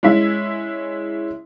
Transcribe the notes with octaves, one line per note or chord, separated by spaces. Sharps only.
G#3 C#4 E4 E5